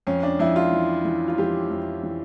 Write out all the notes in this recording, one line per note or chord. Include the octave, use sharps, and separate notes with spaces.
F2 C#4
D4
F2 E4
F4
E3
E3
F4
F2 G4
F2
E3